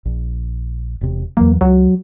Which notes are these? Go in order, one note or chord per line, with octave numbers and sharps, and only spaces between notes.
A#1
E1 C3
E2 E3 F#3 A#3
C#2 F#3